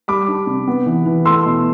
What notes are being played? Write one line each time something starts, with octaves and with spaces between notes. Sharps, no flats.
G3 B5 D6
D4
C3
B3
E3
E3
A3 C6 E6
B2